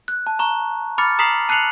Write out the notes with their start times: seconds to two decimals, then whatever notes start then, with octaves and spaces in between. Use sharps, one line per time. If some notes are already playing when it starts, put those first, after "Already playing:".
0.08 F#6
0.27 A5
0.39 A#5 C#6
0.98 B5 D6 F6 A6 C#7
1.19 A#5 D#6 B6 C7 F7 F#7
1.49 A5 F#6 C7 C#7 F7 F#7